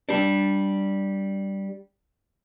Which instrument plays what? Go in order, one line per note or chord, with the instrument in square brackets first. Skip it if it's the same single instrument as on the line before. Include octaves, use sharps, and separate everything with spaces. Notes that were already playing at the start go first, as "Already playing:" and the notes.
[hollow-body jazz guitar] G3 D4